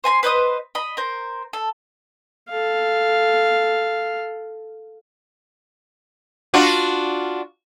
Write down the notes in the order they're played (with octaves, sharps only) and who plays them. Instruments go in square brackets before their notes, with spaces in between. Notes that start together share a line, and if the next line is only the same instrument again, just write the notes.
[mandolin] C5 G#5 A#5 C6
B4 C5 D#5 D#6
D#5 B5
A#4 C5
A4
[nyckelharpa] A4 F5
[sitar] D4 F4 F#4